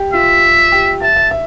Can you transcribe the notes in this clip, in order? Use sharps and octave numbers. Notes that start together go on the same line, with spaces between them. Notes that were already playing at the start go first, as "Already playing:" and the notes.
Already playing: G4
F4 E5
G4
E5 A5
E5
E5